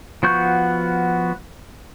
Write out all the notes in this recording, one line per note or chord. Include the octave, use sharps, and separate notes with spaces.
F3 B3 F#4 C#6 G6